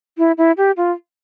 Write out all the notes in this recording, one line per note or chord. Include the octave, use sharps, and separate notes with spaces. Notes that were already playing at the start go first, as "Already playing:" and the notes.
E4
E4
G4
F4